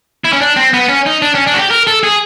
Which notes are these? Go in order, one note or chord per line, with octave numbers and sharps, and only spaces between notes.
E4
C#4
D4
C4
B3
C#4
D#4
D4
C#4
D4
F#4
G4
A#4
A4
G#4